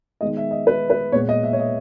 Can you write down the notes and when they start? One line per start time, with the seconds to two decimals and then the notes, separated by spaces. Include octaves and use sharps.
0.21 D#3 G#3 B3 D#5
0.37 E5
0.51 D#5
0.67 B4
0.90 B4
1.12 A#2 G#3 B3 C#5
1.29 D#5
1.43 E5
1.53 C#5
1.59 D#5